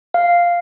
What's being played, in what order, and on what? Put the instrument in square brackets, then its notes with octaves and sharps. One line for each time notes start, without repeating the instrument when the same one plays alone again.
[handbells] F5